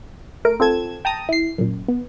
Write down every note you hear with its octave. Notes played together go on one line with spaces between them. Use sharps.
A3 A#4 D7
C4 F4 A4 G#6 E7
G5 A5 A#5 D#6
E4 C7
F#2 A#2
B3